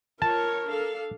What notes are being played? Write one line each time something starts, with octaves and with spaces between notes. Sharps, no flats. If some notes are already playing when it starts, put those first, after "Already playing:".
F4 A#4 C#5 A5
D4 A4 F5